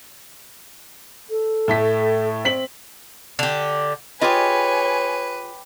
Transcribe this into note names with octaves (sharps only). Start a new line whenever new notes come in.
A4
A2 A3 B6
C4 B6 F#7
D3 G4
F4 G4 G#4 B4 C#5 D#5 G#5 B5